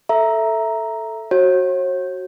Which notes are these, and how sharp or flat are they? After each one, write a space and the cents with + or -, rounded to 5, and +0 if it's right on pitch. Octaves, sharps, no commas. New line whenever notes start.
A4 +0 E5 +0 A#5 +0
F#4 +5 C#5 -45